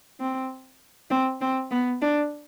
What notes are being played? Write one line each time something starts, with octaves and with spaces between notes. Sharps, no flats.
C4
C4
C4
B3
D4